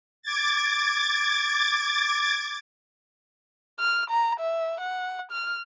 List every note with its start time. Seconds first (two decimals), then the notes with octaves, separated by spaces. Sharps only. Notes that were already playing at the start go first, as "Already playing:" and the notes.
0.22 D6 G#6 A6
3.79 F6
4.10 A#5
4.40 E5
4.81 F#5
5.31 F6